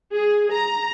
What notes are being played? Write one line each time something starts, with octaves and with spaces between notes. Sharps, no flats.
G#4
A#5